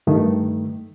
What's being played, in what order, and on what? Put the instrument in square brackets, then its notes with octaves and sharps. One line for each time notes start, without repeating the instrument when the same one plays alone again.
[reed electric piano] G2 D#3 A3